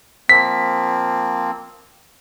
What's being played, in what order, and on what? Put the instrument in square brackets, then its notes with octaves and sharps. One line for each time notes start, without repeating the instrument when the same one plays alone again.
[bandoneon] F3 A#3 C4 [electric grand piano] B6